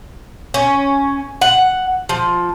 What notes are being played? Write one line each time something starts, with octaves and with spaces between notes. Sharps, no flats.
C#4
F#5
F3